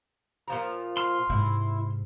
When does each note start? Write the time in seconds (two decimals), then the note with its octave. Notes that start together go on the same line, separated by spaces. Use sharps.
0.48 A#2 F3 A#5
0.97 C6 F6
1.30 G#2 C3 E4